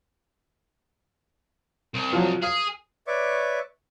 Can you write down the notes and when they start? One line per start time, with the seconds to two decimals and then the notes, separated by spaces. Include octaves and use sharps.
1.94 C2
2.13 F3 F#3
2.42 G#4 F5
3.07 B4 C#5 D5 E5 C#6 D6